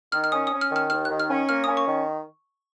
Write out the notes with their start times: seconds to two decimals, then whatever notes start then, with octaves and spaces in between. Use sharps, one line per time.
0.12 D#3 F6
0.24 F6
0.32 C#4 D#6
0.47 D#6
0.52 C#4
0.61 F6
0.71 D#3
0.76 F6
0.90 D#2 F6
1.05 D#3 F#6
1.20 F6
1.29 C#4
1.49 A#3 F6
1.64 C#4 D#6
1.77 C#6
1.87 D#3